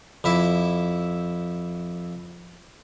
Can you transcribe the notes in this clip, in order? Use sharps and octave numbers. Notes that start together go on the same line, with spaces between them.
F2 E4 E5 D6